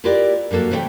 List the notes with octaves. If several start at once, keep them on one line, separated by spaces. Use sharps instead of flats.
E4 F4 G4 A#4 B4 D5
G2 F#3 A#3 A4
C3 E3 A3 D5 E5 G5